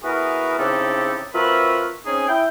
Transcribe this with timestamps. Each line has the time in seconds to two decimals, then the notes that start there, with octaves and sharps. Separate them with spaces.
0.03 B3 E4 F#4 G#4 A#4 B4
0.58 C#3 C4 D#4 E4 G4 A4
1.34 C4 F4 F#4 A#4 B4 E5
2.05 C4 C#4 D#4 G#4
2.28 E4 G5